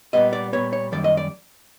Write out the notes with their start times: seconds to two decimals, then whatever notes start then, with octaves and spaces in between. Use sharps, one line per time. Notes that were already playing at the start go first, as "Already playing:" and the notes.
0.13 A#2 G3 B3 D#5
0.33 D5
0.53 A#2 G3 B3 C#5
0.73 C#5
0.92 F#2 D#3 G3 A#3 D5
1.04 D#5
1.17 D5